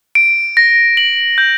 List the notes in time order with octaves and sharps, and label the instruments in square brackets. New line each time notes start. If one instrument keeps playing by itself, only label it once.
[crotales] D7
A#6
F#7
G6